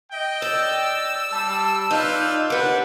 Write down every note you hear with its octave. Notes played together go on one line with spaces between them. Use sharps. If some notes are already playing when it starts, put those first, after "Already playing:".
D#5 G5
D5 E6 A6
G3 A5
D#4 F4 B4 D5 G6
D#2 D4 B4 F#5